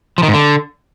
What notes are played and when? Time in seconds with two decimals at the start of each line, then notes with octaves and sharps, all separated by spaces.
0.18 F3
0.23 D#3
0.28 G#2
0.33 D3